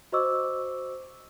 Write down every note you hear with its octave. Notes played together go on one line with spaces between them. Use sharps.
F#4 C5 D#5 C#6 D6 E6